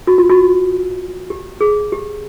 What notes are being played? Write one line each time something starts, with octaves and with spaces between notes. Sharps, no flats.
F#4
F4
F#4
G4
G#4
G4